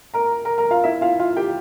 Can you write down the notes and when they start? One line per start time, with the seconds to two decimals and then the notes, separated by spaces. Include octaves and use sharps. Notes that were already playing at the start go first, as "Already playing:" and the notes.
0.14 A#4 A#5
0.45 A#4 A#5
0.58 A#4 A#5
0.70 F4 F5
0.84 E4 E5
1.01 F4 F5
1.19 F4 F5
1.37 G4 G5